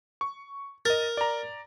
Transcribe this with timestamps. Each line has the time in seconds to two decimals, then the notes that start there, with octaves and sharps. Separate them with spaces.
0.21 C#6
0.85 A#4 D#5 A6
1.17 D5 A#5